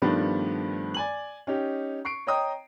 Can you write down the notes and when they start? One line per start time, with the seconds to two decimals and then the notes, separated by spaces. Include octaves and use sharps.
0.02 G2 D#3 F3 A3 B3 D4
0.94 D5 G#5 F#7
1.47 C#4 D#4 G4
2.05 C#6 C7 D7
2.27 C#5 D#5 G5 A#5 D#6